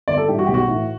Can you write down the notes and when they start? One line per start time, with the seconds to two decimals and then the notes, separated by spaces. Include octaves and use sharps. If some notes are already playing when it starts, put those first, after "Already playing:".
0.08 G1 D5
0.18 A4
0.28 G2 E3 G4
0.39 F#4
0.46 B1 G4
0.54 F#4
0.68 A2 E3